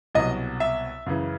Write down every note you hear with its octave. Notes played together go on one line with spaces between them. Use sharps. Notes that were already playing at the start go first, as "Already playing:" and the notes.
C2 B2 F#3 D#5
E5
F#2 C#3 E3